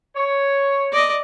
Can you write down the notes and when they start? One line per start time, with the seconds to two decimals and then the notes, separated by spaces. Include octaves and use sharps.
0.16 C#5
0.92 D5 D#5